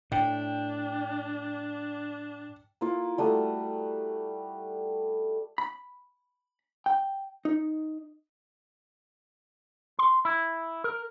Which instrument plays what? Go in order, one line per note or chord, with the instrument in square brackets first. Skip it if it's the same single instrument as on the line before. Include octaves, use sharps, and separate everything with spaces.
[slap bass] A2 [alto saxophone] D4 [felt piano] G5
[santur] A#3 E4 F4
G3 A3 F#4 D#6
[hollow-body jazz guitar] B5
G5
D#4
[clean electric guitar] C6
E4
A#4